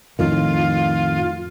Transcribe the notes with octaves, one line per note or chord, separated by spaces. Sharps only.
F2 A2 D#3 F4